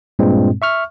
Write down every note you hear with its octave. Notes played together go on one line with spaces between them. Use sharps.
G2 A#2 G#3 C4
E5 C#6 F6